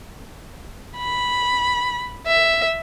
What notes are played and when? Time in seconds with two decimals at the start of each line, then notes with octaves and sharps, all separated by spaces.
0.98 B5
2.27 E5